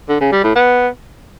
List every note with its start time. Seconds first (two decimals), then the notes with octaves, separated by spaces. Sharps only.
0.09 D3
0.20 C#3
0.32 G3
0.44 A2
0.55 B3